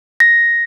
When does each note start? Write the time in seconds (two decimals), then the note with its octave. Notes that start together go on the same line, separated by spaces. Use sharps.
0.20 A#6